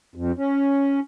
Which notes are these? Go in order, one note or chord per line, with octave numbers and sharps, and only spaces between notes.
F2
C#4